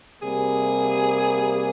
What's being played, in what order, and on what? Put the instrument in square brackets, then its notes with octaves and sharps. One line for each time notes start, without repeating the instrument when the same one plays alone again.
[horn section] C3 G3 A#3 [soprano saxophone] G#4